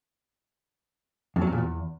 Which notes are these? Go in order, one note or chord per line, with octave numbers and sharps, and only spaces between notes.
F2
F#3
F2
A#2
E2